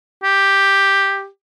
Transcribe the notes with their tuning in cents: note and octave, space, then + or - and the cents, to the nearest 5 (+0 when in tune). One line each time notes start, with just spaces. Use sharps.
G4 +5